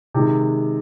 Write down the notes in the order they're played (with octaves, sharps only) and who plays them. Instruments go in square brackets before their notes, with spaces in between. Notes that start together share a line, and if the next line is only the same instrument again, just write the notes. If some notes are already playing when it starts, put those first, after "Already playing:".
[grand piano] C3 D#3 G#3